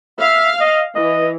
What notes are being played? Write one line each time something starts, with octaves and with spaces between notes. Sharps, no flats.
E5 F5
D#5
E3 D#5